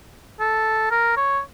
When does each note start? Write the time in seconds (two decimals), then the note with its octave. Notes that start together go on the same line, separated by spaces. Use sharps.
0.40 A4
0.91 A#4
1.17 C#5